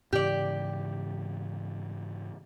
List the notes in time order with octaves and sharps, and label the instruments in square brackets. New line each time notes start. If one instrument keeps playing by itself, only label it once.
[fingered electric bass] G#2 C#3 E3 [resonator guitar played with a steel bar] G4 D5